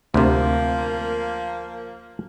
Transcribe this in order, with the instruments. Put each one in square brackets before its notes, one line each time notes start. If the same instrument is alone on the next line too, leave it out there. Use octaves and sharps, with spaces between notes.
[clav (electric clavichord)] D2 C3 [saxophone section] F3 A#3